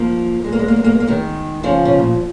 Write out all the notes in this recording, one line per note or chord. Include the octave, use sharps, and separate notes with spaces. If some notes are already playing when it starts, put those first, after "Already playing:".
Already playing: F3 A#3
G#3
A#3
G#3
A#3
G#3
A#3
G#3
A#3
D#3 G#3
C#3 F3
C#3
A#2